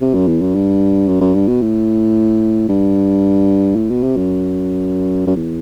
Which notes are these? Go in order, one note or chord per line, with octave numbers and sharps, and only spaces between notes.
C3
F#2
E2
F#2
G2
F#2
F#2
G2
B2
A2
G2
A2
B2
C3
F#2
F#2
E2